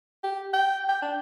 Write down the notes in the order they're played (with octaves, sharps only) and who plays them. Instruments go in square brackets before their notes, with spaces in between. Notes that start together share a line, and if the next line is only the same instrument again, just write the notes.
[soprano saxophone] G4
G5
G5
D4